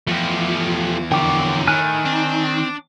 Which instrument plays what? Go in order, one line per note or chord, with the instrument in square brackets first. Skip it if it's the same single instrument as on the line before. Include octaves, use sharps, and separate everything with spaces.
[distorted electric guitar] E2 [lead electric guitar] F3 [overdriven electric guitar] A3 G4
[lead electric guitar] D3 F3 [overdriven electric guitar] A#4 C#5 [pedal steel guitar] G5 D6
[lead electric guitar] D#3 [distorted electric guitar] A3 E4 [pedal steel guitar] G#5 F6 F#6
[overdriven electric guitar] C4 [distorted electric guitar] D4